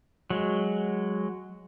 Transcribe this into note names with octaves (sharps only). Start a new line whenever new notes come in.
F#3 G#3